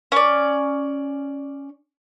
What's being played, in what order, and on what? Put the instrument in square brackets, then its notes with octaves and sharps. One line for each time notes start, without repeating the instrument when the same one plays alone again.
[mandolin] C#4 D5